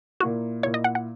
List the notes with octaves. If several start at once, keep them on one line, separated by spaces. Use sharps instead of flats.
A#2 A#3 E4 F#4
A#2 A#3 E4 C#5
D#5
F#5
F#5